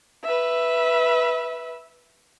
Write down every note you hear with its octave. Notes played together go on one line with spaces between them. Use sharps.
B4 E5